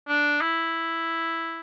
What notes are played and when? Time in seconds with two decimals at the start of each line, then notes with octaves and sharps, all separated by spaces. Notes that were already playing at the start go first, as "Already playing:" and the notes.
0.08 D4
0.41 E4